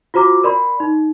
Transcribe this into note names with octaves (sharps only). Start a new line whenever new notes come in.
F4 F#4 C5 A#5 D6
A#4 D5 B5 C6
D#4